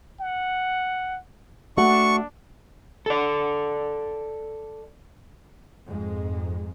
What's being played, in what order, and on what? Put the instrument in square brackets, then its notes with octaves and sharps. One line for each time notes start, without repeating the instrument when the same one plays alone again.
[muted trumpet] F#5
[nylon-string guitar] A3 F#4 F#5 [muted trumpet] D4 [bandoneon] C#6
[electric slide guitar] A4 D5
[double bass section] F2 G#2 G#3